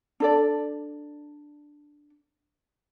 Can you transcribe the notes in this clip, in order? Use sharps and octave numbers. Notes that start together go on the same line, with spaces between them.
D4 A4 D5